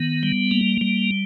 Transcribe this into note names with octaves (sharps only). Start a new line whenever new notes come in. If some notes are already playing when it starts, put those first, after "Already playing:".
Already playing: D#3 B3
G3
A#3
G3